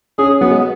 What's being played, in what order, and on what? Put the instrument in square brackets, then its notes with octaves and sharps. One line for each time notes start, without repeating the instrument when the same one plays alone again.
[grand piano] C#4 [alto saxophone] G#4
[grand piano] F#3 [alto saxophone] B3
[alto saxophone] G#3